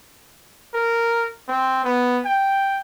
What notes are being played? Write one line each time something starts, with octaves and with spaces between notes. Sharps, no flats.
A#4
C4
B3
G5